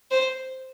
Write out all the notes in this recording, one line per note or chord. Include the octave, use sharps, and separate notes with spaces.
C5